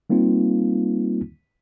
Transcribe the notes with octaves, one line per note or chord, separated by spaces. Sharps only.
G3 A#3 C4 D#4 F4